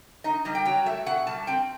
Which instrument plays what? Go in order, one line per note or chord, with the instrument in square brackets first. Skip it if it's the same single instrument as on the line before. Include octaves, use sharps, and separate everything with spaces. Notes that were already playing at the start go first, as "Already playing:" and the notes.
[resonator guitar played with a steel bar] D#4 D#5
G3 D#5
G5
F#3 G5
A3 E5
B2 F#5
G3 A5
C4 G5